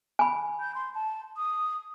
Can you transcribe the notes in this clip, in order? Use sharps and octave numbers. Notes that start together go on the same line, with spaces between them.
G#5 B5
G6
C6
A5
D#6